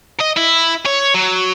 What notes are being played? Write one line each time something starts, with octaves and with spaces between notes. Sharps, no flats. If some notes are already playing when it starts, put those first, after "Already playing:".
D#5
E4
C#5
F#3